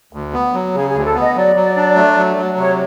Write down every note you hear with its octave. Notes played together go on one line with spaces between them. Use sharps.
D2
B3
F#3
C#3 G#4
D2 G#4
A4
B3
D#5
F#3 D5
F#3
D4
A3
F#3
F#3
C3 C#5